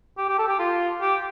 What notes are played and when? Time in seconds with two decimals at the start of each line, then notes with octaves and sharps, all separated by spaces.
0.18 G4
0.29 G4
0.39 A4
0.49 G4
0.59 F4
1.01 G4